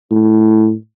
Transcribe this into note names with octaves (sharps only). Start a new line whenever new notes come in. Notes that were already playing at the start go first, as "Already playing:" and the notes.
A2